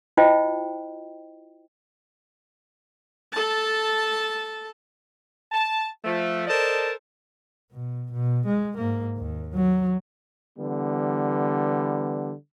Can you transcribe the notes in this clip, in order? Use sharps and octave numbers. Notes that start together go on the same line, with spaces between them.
E4 F4 C5 D#5 G5
A4 A5
A5
F3 A3
A4 A#4 C5 D5 D#5 A5
B2
B2
G#3
G#2 A#3
D#2
F#3
D3 E3 G3 B3